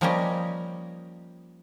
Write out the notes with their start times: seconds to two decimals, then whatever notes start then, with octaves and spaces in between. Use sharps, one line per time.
0.01 F3 G3 A#3 C#4 G4 D#5